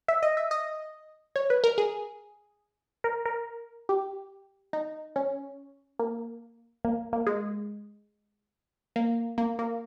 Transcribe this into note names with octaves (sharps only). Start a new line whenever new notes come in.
E5
D#5
E5
D#5
C#5
B4
A#4
G#4
A#4
A#4
G4
D#4
C#4
A#3
A#3
A#3
G#3
A#3
A#3
A#3